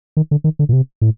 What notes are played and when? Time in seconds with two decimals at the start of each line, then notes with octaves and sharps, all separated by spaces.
0.17 D#3
0.31 D3
0.44 D#3
0.59 D3
0.69 A#2
0.73 C3
1.02 A2